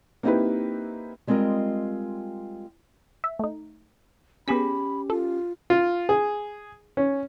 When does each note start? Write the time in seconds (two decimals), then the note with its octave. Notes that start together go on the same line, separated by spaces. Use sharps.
0.23 A#3 C4 D#4 E4 G4 B4
1.27 G3 G#3 C4 F4 A#4 D#5
3.24 E5
3.39 A3 D#4
4.48 B3 C#4 G4 G#4 B5 B6
5.10 F4 A4
5.70 F4
6.09 G#4
6.97 C#4